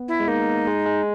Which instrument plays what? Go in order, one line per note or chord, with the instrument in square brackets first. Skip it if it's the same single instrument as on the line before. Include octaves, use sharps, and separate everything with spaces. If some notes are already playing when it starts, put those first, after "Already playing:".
Already playing: [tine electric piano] B3
[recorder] E4
[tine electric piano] G#3
[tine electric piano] A#3 [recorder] D#4
[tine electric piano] G#3
G#3